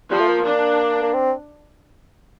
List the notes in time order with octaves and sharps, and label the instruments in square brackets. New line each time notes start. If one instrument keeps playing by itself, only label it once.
[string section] F3 [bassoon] G3
[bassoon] A3
A#3
[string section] D4
[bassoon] A#3
C4